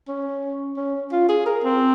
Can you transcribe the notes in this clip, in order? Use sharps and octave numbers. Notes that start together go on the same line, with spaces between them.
C#4
C#4
F4
G#4
A#4
C4